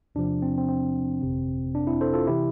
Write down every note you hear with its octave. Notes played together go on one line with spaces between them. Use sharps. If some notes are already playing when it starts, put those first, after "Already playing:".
E2 C3 F3 D4
C4
C4
C4
G1 F2 C3
D4
C4 E4
A4 C5
F4 A4
C3 E3 E4 G4